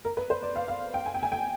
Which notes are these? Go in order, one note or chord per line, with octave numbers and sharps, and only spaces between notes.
A#4
B4
C5
D5
F5
F5
G5
G#5
G5
G#5
G5